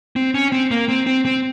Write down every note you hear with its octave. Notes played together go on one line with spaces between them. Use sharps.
C4
C#4
C4
A#3
C4
C4
C4